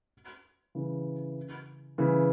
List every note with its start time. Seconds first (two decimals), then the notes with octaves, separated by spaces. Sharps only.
0.75 C#3 E3
1.98 C#3 E3